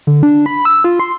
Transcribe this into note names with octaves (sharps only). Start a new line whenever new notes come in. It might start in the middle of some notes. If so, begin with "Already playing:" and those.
D3
D4
B5
E6
F4
C6